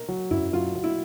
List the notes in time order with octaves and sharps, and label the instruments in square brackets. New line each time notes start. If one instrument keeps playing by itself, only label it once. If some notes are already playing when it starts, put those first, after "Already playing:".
Already playing: [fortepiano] A#4
[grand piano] F#3
[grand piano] F#2 [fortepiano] E4
[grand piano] F#3 [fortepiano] F4
[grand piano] F#3
[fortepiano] E4